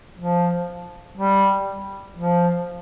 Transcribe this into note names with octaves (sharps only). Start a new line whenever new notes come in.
F3
G3
F3